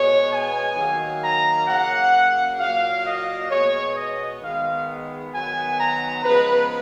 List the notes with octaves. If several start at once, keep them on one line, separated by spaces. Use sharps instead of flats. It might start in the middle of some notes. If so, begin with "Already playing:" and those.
Already playing: B2 G#3 B3 C#5
G#5
D#3 F#3 A#3
A#5
C#3 F#3 A#3 F#5
A#2 F#3 A#3 F5
D#5
B2 G#3 B3 C#5
D#5
D#3 G#3 B3 F5
D#3 F#3 B3 G#5
A#5
C#3 F3 G#3 B3 B4